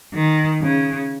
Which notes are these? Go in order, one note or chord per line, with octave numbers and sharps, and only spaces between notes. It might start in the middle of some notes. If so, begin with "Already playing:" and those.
D#3
C#3